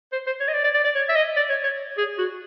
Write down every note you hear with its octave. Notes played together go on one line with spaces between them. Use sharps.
C5
C5
C#5
D#5
D5
D5
D5
D5
C#5
E5
D#5
D5
C#5
C#5
G#4
F#4